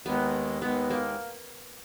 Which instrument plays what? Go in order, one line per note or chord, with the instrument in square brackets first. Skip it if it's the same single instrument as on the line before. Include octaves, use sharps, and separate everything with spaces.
[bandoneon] D#2 D#3 G#3 [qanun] B3
[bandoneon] D#2 D#3 G#3 [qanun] B3
[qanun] A#3